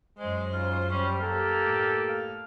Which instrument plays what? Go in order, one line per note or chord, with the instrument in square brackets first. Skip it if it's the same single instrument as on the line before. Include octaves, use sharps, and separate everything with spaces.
[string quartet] F#2 C5 [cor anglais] G#3
[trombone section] G#2 C#3 [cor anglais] F4
[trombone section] G3 [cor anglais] C#4
[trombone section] A#3 G4 A4 [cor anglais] A#4
[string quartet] A2
[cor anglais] F5